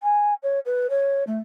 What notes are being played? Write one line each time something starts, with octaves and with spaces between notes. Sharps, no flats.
G#5
C#5
B4
C#5
A3